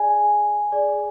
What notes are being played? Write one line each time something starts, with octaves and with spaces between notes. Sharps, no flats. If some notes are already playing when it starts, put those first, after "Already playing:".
Already playing: G#4 D5 G#5
G#4 D5